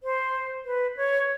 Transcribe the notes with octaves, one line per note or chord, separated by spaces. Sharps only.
C5
B4
C#5